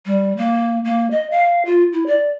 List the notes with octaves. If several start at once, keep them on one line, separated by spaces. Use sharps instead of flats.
G3
A#3
A#3
D#5
F5
F4
E4
D5